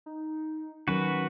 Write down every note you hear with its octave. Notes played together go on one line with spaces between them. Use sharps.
D#4
D#3 F#3 C#4 F#4 A#4 B4